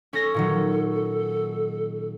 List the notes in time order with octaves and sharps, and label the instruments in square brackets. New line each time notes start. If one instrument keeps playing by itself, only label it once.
[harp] C#4 A#6 [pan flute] A4
[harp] A#2 D#3 F#3